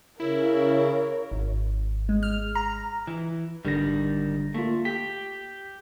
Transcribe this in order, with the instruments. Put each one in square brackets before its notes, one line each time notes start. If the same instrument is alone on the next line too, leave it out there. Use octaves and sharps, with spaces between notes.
[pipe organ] C#3 [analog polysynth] E4 [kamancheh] A#4 [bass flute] C#5
[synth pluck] G#1
G#3
F6
A#5
[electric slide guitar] E3
[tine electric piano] G#1 D3 A#6 [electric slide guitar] D#3 G3
[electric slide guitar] A3 [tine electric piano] A#3 F4
[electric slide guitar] G4 [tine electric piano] B6